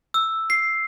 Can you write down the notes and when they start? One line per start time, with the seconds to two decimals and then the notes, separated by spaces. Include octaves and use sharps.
0.14 E6
0.50 C7